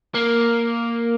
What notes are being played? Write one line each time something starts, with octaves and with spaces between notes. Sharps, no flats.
A#3